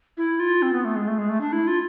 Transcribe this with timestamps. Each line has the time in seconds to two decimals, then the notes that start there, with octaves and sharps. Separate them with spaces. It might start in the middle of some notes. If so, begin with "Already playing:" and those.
0.17 E4
0.40 F4
0.62 C4
0.73 B3
0.85 A3
0.96 G#3
1.08 A3
1.18 G#3
1.29 A3
1.41 D4
1.53 E4
1.67 F4